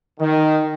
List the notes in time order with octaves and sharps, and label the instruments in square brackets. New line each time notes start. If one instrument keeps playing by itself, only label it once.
[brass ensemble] D#3